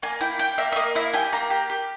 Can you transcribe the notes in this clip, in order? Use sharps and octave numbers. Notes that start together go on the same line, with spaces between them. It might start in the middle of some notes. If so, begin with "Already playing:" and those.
A#3 G#5
E4 G5
G4 G5
A#3 E5
E5
A#3 D#5
E4 E5
G4 G#5
A#3 A#5
G4
G4